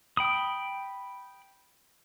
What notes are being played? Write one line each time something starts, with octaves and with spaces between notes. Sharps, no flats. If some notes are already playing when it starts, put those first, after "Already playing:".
G5 B5 D#6